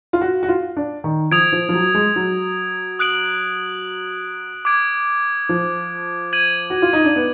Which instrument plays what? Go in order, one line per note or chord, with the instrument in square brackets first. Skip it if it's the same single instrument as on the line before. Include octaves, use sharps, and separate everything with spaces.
[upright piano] F4
F#4
F#4
F4
D4
D#3
[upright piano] F3 [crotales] D#6 G#6 D7 F7
[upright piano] F3
F3
F#3
G#3
F#3
[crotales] D#6 F#6 D7 F#7
D6 G#6 D7
[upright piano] F3
[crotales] G#6 D#7 F#7
[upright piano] F#4
F4
D#4
D4
B3